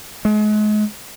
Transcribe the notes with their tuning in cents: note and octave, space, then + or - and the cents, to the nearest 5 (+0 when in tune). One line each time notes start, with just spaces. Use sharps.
G#3 +35